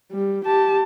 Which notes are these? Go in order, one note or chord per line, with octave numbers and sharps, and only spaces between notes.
G3
G4 A5